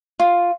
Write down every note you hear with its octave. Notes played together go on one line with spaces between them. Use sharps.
F4